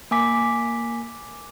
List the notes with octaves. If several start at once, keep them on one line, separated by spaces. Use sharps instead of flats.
A#3 G#5 D6 B6